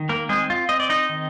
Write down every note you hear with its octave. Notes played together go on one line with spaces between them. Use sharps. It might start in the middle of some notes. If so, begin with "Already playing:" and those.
Already playing: D#3
A#3 A#4
G#3 C4 G#4
F4
C4 D#5
D5
D#4 D#5
D#3